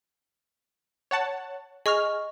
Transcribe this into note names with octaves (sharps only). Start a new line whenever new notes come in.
C#5 F#5 A5
G#4 D#5 C#6 F6